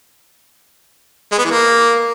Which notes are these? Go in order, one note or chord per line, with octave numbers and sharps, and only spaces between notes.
G#3
B3
E3
A#3